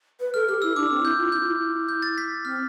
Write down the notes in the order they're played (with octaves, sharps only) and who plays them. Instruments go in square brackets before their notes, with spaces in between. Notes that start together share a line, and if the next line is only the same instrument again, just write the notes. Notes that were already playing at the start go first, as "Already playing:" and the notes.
[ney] B4
[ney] A4 [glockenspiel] F6
[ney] G4 [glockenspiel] F6
[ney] E4 [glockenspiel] E6
[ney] D4 [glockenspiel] D6
[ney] C4
[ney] E4 [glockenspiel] G6
[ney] F4
[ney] E4 [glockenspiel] G6
[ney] F4
E4
[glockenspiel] G6
A6
B6
[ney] C4 [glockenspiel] F6